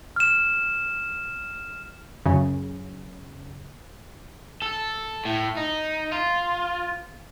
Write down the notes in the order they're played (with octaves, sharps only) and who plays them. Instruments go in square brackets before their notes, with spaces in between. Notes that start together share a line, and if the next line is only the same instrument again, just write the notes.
[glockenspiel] F6 E7
[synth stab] F#2 C#3
[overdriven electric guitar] A4
A2
D#4
F4